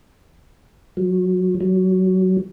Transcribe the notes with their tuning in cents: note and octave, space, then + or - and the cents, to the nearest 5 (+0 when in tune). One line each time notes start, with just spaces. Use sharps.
F#3 -15
F#3 +15